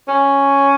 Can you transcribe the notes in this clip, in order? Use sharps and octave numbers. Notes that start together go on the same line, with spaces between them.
C#4